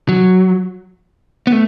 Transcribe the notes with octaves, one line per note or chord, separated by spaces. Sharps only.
F#3
B3
A3